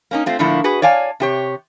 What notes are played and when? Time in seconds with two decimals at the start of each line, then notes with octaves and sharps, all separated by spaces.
0.11 A#3 C#4 D#4
0.26 A3 C4 F4
0.39 A2 D3 F3 A3 A#3 E4
0.64 F#4 G#4 B4
0.82 C#5 D5 F5 G#5 A5
1.20 C3 G4 C#5